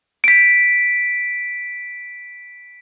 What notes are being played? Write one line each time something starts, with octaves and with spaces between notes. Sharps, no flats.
B6 D7